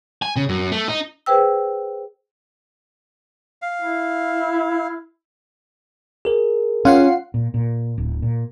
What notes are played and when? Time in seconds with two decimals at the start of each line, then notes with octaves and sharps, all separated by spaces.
0.22 G#5
0.36 C#3
0.49 F#2
0.72 A3
0.88 D#4
1.26 G#4 B4 C5 G5 E6
3.62 F5
3.82 E4
6.25 G#4 A#4
6.85 C#4 F4 F#5 C7
7.34 A#2
7.54 A#2
7.98 D1
8.22 A#2